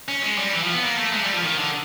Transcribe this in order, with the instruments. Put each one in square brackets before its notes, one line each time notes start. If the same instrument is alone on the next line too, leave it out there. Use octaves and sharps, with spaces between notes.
[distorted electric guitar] C#4
G#3
G3
E3
F3
B3
A#3
A3
G#3
G3
F3
D#3
D3